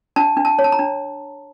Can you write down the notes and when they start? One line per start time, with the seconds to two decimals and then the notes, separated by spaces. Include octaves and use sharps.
0.16 D4 A5
0.37 D4
0.45 A5
0.59 C#5
0.64 A5
0.72 A#5
0.79 D4